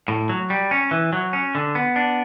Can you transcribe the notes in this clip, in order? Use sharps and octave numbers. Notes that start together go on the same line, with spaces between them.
A2
F#3
G3
C#4
E3
F#3
C#4
D3
B3
D4